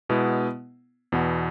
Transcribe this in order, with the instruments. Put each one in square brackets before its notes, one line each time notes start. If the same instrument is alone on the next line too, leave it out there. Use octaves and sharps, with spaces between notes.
[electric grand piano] B2 G#3 B3 E4
E2 B2 B3